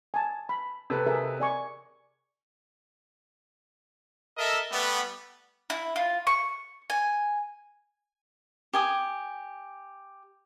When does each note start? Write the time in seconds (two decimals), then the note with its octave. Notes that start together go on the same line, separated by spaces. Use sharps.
0.14 G#5 A5
0.49 B5
0.90 C3 A4 B4
1.07 G#4 A#4 E5
1.40 D5 G#5 C#6
4.38 A4 A#4 D#5 E5
4.72 G3 A3 B3
5.70 E4
5.96 F4
6.27 C#6
6.90 G#5
8.73 G4 G#5 D#6